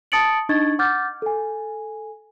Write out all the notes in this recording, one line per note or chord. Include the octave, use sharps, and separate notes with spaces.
A5 D#6 A6 C#7 D7 F#7
D4 D#4 D#5 C#6 G#6 A6
F#5 D6 F6 G6 A6
A4 G#5